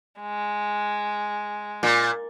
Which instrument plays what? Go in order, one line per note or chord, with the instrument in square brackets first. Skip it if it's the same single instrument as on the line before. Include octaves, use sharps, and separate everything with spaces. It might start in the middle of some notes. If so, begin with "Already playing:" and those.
[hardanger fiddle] G#3
[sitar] A#2